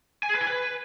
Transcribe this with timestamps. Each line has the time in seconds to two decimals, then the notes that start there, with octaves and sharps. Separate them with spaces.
0.23 G#5
0.29 G#4
0.35 B4
0.41 G#5
0.47 B4